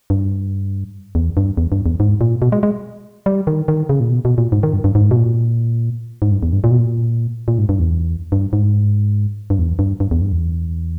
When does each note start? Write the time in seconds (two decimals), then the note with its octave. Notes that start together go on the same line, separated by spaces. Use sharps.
0.10 G2
1.15 E2
1.37 G2
1.57 E2
1.72 G2
1.86 E2
2.00 G#2
2.21 A#2
2.42 B2
2.52 G#3
2.63 G#3
3.26 G3
3.47 D#3
3.68 D#3
3.89 C#3
4.00 A#2
4.10 B2
4.25 B2
4.38 A#2
4.52 G#2
4.63 D#3
4.74 G2
4.84 G2
4.95 G#2
5.11 B2
5.16 A#2
6.22 G#2
6.32 G2
6.43 E2
6.53 G2
6.64 A#2
6.71 B2
6.78 A#2
7.48 A#2
7.58 G#2
7.69 G2
7.80 E2
8.32 G2
8.53 G#2
9.50 G2
9.59 E2
9.79 G2
10.00 G2
10.11 E2
10.22 G2
10.32 E2